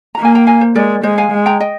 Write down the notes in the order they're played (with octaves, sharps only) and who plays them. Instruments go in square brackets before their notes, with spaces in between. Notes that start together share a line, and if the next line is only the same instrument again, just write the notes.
[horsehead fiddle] A#3 [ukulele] A#5
[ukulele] G#5
G5 A#5
F5 G#5
C5
[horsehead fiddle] G#3 [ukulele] A#4 D5
[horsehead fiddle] G#3 [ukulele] C5 D#5
[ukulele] F5 G#5
[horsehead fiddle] G#3
[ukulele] G5 A#5
D#5 G5